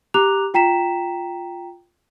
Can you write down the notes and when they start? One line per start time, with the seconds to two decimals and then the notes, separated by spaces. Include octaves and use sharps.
0.14 G4 A#5 D6 F#6 F7
0.54 F4 G5 A#5 B6 E7